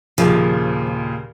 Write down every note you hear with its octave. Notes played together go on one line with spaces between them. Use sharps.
D#2 A#2 C#3 F3